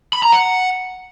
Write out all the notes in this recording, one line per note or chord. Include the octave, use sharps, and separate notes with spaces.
B5
A#5
F#5